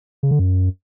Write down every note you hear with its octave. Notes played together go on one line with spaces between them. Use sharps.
C#3
D3
F#2